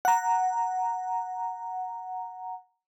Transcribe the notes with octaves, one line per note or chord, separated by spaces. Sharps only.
F#5 A#5